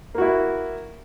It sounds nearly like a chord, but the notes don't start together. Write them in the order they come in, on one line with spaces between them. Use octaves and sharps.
A#3 F#4 E4